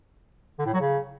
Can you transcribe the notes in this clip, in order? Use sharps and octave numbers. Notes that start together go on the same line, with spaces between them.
D3
A2
F#3
C#3